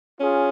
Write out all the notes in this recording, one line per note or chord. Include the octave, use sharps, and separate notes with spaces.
C#4 F4 G#4